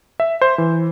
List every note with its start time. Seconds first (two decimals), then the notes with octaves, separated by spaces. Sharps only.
0.20 E5
0.41 C5
0.58 E3